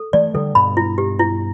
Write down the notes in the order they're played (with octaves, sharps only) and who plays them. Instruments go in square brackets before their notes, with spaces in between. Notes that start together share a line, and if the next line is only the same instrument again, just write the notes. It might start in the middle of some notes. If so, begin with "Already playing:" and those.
Already playing: [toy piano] A4
[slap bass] E3 A3 [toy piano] D5
[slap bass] D3 G3 [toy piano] A4
[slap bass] G2 B2 [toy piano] B5
[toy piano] E4
G4
E4